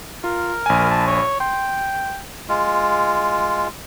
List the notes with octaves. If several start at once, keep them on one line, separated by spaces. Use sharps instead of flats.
F4 A#4
A#1 G#5
A5
C#5
G5 C6
G#3 F4